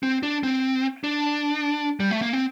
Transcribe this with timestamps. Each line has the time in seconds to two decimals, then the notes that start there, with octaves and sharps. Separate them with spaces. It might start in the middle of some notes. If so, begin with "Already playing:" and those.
0.03 C4
0.23 D4
0.43 C4
1.04 D4
2.00 G3
2.11 A3
2.22 A#3
2.33 C4